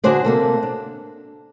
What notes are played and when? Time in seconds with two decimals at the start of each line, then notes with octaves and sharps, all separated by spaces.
0.04 D3 D4 F#4 G#4 C5 D5
0.25 C3 A#3 A4
0.63 D4